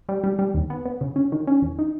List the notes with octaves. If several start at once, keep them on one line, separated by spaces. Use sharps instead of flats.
G3
G3
G3
D#2
B3
B3
C#3
C#4
D#3
C#4
E2
D#4